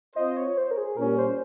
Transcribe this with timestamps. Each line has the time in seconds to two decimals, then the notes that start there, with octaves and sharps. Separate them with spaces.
0.16 C4 F4 C5 D#5
0.37 C#5
0.57 C5
0.71 A#4
0.77 G#4
0.97 A#2 G3 C#4 A#4
1.18 C5